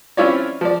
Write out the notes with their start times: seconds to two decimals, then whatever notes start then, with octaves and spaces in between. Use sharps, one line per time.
0.17 C4 C#4 E4 F4 C#5 D5
0.61 F3 D5